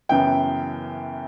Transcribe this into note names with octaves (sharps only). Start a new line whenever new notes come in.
F#2 C#3 E3 B3 E4 G5